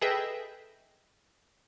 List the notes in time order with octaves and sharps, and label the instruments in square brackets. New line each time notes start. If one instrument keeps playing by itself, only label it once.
[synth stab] G#4 A4 B4 D#5 E5 G5